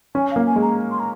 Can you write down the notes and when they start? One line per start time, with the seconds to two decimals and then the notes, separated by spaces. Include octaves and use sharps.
0.14 C#4 G#5
0.31 F5
0.36 A#3
0.46 G#5
0.56 G#3
0.61 A#5
0.90 C6
0.99 A#5